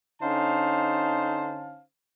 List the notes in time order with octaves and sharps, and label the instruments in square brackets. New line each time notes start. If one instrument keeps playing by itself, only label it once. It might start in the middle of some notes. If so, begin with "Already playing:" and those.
[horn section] D3 C#4 D#4 C5 F5 A5